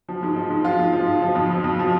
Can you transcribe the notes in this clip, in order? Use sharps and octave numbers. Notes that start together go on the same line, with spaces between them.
F3
G#2
F3
G#2
F3 F4
G#2
F3
G#2
F3
F2
F3
F2
F3